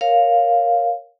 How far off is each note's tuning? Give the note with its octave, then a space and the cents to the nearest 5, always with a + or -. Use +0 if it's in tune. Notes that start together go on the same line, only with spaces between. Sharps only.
A#4 +5 C#5 +0 F5 +0